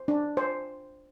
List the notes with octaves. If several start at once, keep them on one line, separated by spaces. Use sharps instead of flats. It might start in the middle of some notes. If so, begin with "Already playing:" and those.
Already playing: C5
D4
C5